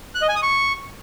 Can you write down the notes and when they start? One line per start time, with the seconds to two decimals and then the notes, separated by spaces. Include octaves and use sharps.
0.15 F#6
0.22 D#5
0.29 G#5
0.36 D#6
0.42 C#6